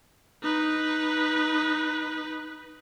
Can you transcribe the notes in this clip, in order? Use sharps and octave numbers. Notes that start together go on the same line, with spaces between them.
D#4 B4